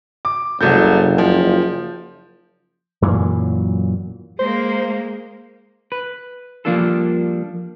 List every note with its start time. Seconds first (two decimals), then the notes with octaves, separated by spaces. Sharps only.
0.25 D6
0.61 F#1 C2 A4 G6
1.18 F3
3.02 F#2 A#2 E3 F#3
4.39 G#3 A#3 C5
5.92 B4
6.65 F3 G3 A#3 D4 F4 A4